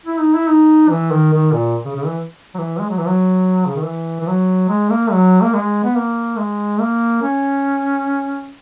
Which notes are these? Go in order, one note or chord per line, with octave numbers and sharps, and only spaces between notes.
E4
D#4
E4
D#4
E3
D#3
D#3
A#2
C#3
C#3
E3
F#3
E3
G#3
F#3
E3
F#3
C#3
D#3
E3
E3
F#3
G#3
A#3
F#3
A#3
G#3
B3
A#3
G#3
A#3
C#4